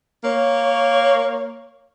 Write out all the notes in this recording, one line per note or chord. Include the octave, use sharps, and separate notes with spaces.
A#3 C#5